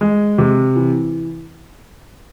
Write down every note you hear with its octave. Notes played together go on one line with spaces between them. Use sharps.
G#3
C3
E3